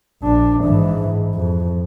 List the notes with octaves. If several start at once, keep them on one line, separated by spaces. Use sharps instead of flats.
A#1 D4
G#2 E3
F2